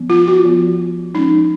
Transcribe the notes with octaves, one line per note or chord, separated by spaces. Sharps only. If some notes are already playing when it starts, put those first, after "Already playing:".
Already playing: F3 B3
F4
F#4
F3 B3
F3 G#3 C#4 D#4